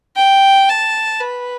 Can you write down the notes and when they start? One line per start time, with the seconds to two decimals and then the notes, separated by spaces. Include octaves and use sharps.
0.16 G5
0.69 A5
1.20 B4